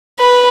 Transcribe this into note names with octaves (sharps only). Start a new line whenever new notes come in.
B4